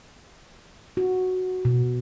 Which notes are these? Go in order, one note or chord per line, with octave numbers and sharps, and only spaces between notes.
F#4
B2